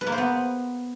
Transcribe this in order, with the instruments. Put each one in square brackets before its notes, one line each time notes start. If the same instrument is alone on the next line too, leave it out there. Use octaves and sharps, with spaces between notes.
[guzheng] B4
A#3
C5
B3